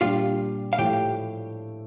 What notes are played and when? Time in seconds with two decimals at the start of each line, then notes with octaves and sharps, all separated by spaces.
0.01 A#2 G3 D4 F4 G4 F5
0.73 F5
0.78 A2 F3 A3 G4 G5